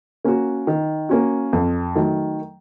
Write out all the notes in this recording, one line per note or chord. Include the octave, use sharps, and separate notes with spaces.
A#3 C#4 F#4
D#3
A#3 C#4 F#4
F2
D#3 F#3 A3